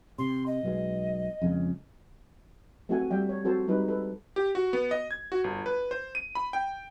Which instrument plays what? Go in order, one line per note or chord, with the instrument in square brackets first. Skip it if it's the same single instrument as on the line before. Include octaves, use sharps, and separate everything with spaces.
[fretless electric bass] C3 [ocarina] C6
[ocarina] D#5
[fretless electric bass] B1 B2 G#3
F2 C#3 G#3
[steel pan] A3 C4 F#4 A4 F#5 G#5
G3 D5 E5 G5
C#5
C4 F#4 A4 C5 A5
G3 G#3 D#4 B4
A4 B4
[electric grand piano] G4
F#4
B3
D#5
G#6
F#4
G1
B4
C5
D#7
B5
G5